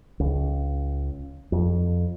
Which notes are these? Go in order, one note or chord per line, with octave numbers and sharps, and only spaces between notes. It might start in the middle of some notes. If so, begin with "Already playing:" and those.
C#2
F2